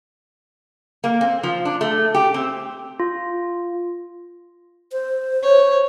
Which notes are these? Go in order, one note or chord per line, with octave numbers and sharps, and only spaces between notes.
A#3
C4
F3
D4
A3
G4
C4
F4
C5
C#5